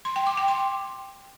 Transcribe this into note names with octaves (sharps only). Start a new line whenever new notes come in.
C6
G5
D6
G5
C6